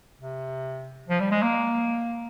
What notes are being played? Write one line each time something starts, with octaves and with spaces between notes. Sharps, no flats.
C3
F3
G3
G#3
A#3